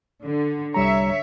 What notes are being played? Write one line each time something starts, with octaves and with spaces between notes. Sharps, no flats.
D3
C2 G3 C#5 E5 A#5